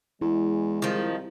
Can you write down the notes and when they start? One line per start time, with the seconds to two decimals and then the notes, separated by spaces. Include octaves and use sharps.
0.21 E2 G#3 E4
0.82 C2 D#3 F3